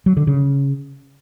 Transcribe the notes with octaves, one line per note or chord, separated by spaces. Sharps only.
F#3
D3
C#3